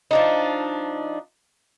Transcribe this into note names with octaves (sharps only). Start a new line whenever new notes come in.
F3 D4 D#4